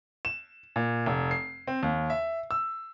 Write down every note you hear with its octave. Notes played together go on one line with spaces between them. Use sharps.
E7
A#2
F1
C7
C4
D#2
E5
E6